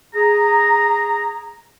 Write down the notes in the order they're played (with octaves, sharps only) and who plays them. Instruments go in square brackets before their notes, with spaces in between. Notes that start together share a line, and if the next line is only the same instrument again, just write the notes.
[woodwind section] G#4 A#5